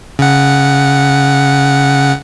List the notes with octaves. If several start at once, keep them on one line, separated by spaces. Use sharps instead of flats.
C#3 F#5